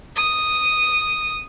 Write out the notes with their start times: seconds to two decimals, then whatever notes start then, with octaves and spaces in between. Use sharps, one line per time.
0.16 D#6